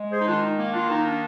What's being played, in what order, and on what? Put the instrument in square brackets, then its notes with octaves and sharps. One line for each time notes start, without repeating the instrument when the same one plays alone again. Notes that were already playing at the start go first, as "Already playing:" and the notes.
Already playing: [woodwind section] G#3
G#4 C5
D#4
D#3 D4 F4
D#4
A#3
D4 F4
D#3 D#4
D4